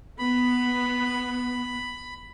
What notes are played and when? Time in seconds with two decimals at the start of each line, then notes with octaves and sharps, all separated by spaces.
0.19 B3 B5